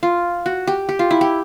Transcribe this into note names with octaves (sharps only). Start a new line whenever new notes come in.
F4
F#4
G4
G4
F4
E4
G4